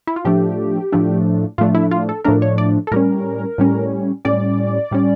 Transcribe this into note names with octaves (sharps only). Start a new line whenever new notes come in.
E4
F4
A2 F3 A3 D4 G4
A2 F3 A3 D4
A2 F3 A3 D4 F4
E4
F4
A4
A2 F3 A3 D4 A#4
C#5
D5
A4
A2 G3 C#4 A#4
A2 G3 C#4
A2 G3 C#4 D5
A2 G3 C#4